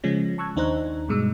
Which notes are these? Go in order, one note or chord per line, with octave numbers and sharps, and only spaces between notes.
C#3 F3 G#3 C#4 A#6
A5 C#6 E6 F#6 G#6
D#2 D4 D#4 C5 A#5 F#6
G2 B2 G#3 E6